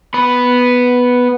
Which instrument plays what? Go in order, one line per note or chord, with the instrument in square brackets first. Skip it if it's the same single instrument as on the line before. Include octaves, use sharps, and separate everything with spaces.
[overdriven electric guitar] B3 B5